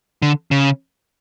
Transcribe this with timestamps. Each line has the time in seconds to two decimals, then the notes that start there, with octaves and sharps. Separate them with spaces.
0.22 D3
0.51 C#3